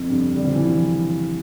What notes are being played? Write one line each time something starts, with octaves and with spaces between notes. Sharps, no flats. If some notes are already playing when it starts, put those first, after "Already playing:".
Already playing: F2
G2
G3
F3
E3
F3